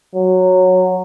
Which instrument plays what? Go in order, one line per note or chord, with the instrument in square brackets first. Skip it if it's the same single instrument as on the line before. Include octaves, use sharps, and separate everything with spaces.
[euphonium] F#3